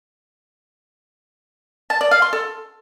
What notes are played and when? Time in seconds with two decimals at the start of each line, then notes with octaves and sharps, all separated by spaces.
1.90 A5
2.01 D5
2.11 F5
2.22 C6
2.33 A4